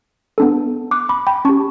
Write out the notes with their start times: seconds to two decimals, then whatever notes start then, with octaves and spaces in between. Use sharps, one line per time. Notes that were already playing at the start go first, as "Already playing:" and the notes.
0.38 B3 D4 A4
0.91 D6 F#6
1.09 B5 D6
1.27 G5 B5
1.45 C#4 G4 A5 C#6